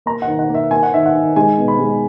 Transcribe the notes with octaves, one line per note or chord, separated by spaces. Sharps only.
A#3 A#5
F#5
D#3
F#5
A#3
E5
A#3 G#5
F#5
D#3 E5
F#5
D#3
G#3 G#5
B2
B5
G#3